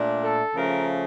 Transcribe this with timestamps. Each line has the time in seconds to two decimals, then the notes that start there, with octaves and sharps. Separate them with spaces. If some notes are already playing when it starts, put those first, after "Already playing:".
Already playing: A#2 A3 D4
0.22 A4
0.56 C#3 F3 A3 A#4